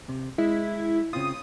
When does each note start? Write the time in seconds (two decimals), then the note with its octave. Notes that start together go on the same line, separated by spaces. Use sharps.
0.09 C3
0.38 G#3 E4
1.13 C#3 C4 F4 D#6